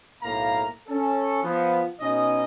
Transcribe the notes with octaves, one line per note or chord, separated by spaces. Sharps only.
B1 A2 A#3 F5 A#5
C#4 A4
F3 B3
B2 C#4 D#4 D#5